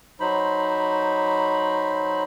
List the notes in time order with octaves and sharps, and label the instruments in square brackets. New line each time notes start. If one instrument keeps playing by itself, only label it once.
[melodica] F#3 D#4 C5 B5